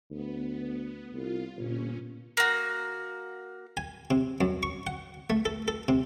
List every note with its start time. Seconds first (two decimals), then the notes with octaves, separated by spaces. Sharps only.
0.11 D2 B3
1.13 C2 F4
1.56 G1 A#2 C#4
2.37 A#3 F#4
3.77 G#5
4.11 C3
4.41 F#2
4.63 C#6
4.87 F#5
5.30 A3
5.45 A4
5.68 A4
5.88 C3